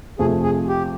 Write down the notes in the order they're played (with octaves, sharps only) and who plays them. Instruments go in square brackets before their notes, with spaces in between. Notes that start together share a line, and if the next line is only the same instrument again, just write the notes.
[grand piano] F2 C3 F3 A3 [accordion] G#4
[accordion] G#4
G4